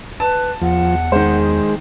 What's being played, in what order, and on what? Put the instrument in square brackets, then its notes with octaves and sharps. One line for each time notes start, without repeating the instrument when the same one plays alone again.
[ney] B4 [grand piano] A5
[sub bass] E2 [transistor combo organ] F3 [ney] F#5
[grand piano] D#3 C5 [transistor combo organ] G#3